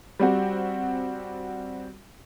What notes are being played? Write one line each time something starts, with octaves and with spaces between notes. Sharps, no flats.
G3 C4 F#4